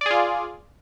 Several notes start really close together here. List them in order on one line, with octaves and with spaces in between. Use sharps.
D5 G#4 F4